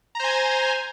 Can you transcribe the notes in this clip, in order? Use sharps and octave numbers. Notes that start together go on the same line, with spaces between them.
C5 G#5 A#5